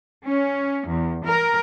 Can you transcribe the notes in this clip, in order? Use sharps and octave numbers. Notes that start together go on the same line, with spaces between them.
C#4
E2
A#4